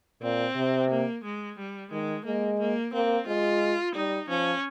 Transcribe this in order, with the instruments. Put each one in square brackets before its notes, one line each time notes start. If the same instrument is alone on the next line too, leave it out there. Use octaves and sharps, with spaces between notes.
[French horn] A#2 [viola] C4
[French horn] C3
[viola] A#3
G#3
G3
[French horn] D#3 [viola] G#3
[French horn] G#3 [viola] A#3
[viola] A#3
[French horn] A#3 [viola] C4
[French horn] G#3 [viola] F4
[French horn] G3 [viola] D#4
[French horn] F3 [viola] C#4